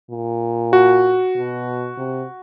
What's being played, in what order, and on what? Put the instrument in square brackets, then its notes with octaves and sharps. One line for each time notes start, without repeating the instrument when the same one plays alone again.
[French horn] A#2
[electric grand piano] F#4
[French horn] B2
C3